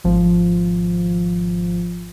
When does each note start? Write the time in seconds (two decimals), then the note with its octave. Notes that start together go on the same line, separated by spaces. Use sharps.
0.04 G#1 F3